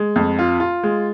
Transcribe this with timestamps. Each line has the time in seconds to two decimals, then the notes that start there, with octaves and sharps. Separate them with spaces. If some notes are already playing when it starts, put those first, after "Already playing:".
Already playing: G#3
0.16 F2
0.39 F4
0.60 F4
0.83 G#3